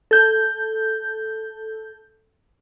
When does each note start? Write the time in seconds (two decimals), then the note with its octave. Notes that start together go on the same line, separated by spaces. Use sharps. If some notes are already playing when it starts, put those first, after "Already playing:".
0.11 A4 G6